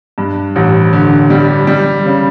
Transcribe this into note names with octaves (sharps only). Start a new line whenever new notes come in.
G2
A1
D3
G3
G3
C#3